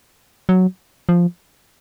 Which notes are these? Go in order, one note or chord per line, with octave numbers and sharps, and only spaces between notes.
F#3
F3